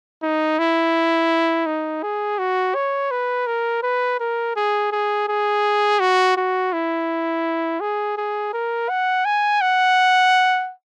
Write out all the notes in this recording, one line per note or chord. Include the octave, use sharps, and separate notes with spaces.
D#4
E4
D#4
G#4
F#4
C#5
B4
A#4
B4
A#4
G#4
G#4
G#4
F#4
F#4
E4
G#4
G#4
A#4
F#5
G#5
F#5